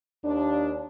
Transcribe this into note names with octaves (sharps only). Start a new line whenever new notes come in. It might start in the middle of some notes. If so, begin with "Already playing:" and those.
D#2 D4